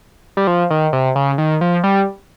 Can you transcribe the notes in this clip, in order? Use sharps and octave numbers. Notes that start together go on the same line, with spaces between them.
G3
F3
D#3
C3
C#3
D#3
F3
G3